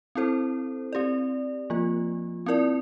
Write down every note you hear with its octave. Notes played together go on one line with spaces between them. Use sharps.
C4 E4 A4 C5
C4 G4 D5
F3 A#3 F4
C4 E4 A#4 D5